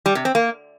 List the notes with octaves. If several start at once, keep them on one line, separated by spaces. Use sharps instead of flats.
G3
C3
C4
A#3